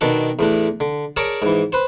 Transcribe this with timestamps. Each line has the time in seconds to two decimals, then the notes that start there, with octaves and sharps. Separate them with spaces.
0.01 B2 D#3 D4 A4
0.39 E2 A2 D4
0.80 D3
1.17 G#4 A#4 C#5 D5 A5
1.42 G#2 E3
1.72 B4 C5